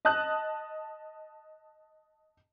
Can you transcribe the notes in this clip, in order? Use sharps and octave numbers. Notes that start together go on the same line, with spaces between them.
D#5 A5 D#6 F#6